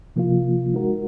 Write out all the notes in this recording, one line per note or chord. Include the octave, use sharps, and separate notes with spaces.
C3 F3 A#3 F4
G#3 D#4 F#4 A#4